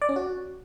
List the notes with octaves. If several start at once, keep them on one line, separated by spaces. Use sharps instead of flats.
D5
C#4
F#4